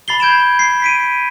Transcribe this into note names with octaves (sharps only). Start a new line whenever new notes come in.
B5 A6 C7 G7
G6 G#6 D7 E7
C7
B6 D7 D#7